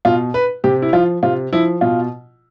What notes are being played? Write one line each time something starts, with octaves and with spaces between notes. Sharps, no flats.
B2 F4
B4
C3 G4
E4
F3 F4
C3 F4
F3 E4
B2 F4